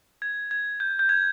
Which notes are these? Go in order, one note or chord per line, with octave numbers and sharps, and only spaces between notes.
G#6
G#6
G6
G6
G#6